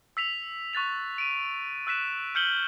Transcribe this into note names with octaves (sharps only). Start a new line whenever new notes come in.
E6 B6 F7
C#6 F#6 A6 F7
D7 D#7
E6 F#6 B6 E7
F6 G6 C#7 F#7 G7